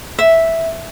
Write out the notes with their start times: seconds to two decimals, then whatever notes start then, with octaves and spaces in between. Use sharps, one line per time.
0.19 E5